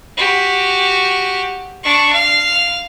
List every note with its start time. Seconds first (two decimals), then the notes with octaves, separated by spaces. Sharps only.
0.17 F#4 G4
1.83 D4 C#6
2.13 F5